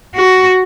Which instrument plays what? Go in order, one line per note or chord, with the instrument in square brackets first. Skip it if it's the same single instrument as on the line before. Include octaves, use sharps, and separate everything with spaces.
[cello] F#4